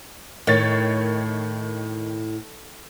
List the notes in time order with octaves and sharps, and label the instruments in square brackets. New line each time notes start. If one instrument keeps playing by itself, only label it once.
[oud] A2 [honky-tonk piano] D#3 C#5 A6